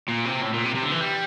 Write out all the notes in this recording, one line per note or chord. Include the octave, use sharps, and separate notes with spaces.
A#2
C3
A2
A#2
C3
C3
D3
E3
G3